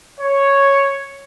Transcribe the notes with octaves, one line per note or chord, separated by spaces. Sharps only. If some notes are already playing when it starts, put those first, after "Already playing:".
C#5